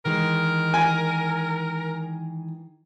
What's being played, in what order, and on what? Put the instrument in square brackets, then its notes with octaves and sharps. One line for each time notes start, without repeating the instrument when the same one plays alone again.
[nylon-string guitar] D#3 E3 G#3 [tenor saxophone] A#4
[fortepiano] G#5